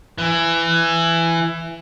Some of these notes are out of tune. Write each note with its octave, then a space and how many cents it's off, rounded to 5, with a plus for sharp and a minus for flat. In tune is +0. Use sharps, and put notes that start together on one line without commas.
E3 +15